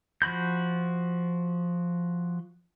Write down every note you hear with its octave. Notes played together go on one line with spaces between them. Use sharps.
F3 F#4 B5 G6